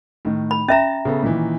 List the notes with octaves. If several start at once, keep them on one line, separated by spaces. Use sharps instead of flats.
A2 D#3
B5
C#4 E5 A#5 A6 A#6
C#3 B3 A4
A#2 D#3 E3